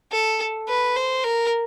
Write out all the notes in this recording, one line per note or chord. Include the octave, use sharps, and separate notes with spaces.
A4
B4
C5
A#4